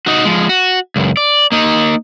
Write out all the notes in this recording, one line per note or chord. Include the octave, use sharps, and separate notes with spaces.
D#4 F#4
F3 G#3
F#4
C#2 F#2
D5
A#3 D#4